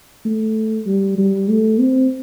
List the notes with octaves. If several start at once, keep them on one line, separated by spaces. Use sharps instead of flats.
A3
G3
G3
A3
C4